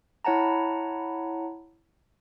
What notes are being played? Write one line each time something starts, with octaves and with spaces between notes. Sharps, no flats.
E4 C#5 F#5 A5 A#5